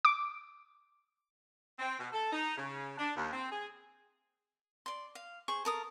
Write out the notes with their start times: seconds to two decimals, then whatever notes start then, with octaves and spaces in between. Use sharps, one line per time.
0.05 D6
1.79 C4
1.99 B2
2.13 A4
2.32 D#4
2.57 C#3
2.98 D4
3.16 D#2
3.33 C4
3.51 G#4
4.86 D5 C6
5.15 F5
5.48 G#4 C5 C#6
5.65 A4 A#4 D#6